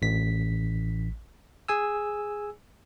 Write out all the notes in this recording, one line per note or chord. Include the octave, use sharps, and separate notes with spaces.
A1 B6
G#4 G#5 E6